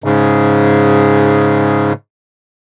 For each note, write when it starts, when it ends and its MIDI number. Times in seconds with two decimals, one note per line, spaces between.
0.04 1.93 44
0.04 1.93 49